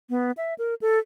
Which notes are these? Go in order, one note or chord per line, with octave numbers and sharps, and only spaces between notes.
B3
E5
A#4
A4